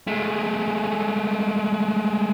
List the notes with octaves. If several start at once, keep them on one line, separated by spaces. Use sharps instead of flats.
G#3 A3